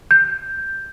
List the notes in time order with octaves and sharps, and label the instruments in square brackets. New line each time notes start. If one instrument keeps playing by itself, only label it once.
[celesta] G6